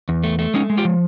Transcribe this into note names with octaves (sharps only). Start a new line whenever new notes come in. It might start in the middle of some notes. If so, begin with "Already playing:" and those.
E2
A3
A3
G#3 C#4 D#4
G#3
F4 G4
F3